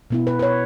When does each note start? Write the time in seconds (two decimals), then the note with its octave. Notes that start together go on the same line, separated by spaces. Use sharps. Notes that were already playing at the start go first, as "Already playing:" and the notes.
0.10 B2 B3 E4
0.27 B4
0.39 B4
0.43 C#5